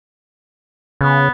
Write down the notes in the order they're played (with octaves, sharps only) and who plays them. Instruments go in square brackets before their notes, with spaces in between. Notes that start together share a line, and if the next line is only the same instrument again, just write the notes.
[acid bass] C#3 [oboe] B3